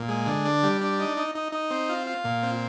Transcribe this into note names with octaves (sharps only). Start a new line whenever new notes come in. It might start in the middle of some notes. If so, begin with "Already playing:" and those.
Already playing: A#2
G#3
D3
D4
G3
D4
D#4
D#4
D#4
D#4
C4
F4
F4
A#2
C4